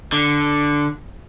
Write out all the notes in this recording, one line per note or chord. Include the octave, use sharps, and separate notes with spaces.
D3